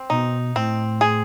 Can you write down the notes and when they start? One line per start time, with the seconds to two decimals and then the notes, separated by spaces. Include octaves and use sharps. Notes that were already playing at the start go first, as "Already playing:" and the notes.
Already playing: C4
0.10 B2 D#4
0.56 A2 C4
1.01 G#4